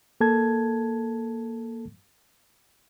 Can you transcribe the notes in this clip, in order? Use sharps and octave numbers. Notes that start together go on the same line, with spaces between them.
A#3 A4 A5 G#6